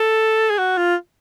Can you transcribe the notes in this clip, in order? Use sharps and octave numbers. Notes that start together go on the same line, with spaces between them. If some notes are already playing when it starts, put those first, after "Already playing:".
Already playing: A4
G#4
F#4
F4